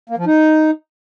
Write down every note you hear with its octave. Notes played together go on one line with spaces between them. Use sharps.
A#3
F3
D#4